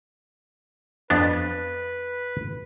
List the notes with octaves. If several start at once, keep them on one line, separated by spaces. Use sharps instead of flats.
F2 B3 D4 B4